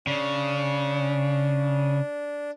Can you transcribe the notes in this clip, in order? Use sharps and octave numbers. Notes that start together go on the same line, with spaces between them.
C#3 D4